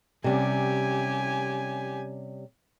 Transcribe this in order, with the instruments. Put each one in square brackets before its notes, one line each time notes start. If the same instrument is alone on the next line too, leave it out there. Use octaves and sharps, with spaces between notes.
[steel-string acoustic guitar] C3 G3 C#4 [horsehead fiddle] G4 G#5